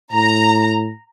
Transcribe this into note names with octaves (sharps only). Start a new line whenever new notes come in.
A2 A#5